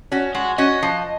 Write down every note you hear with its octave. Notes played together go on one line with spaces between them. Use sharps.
C#4 F#4
G#3 F#4
C#4 F#4 D#5
F3